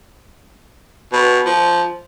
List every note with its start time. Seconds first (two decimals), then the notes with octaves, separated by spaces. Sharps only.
1.13 B2
1.46 F3